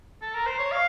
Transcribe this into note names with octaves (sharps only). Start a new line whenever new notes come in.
A4
A#4
C5
C#5
F5